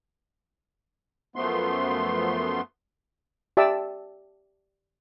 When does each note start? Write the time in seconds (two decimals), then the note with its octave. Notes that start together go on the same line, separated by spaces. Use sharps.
1.36 F#2 F3 A3 B3 C6
3.57 G4 D5 E5 A5 D6 E6